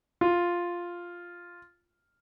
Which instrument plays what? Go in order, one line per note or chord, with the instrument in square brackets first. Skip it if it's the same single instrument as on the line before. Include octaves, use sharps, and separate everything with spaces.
[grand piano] F4